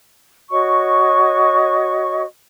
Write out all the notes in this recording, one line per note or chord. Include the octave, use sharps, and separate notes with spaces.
F#4 C#5 D#5 C#6